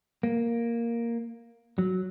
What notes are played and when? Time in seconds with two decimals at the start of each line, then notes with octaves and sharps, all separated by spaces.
0.23 A#3
1.78 F#3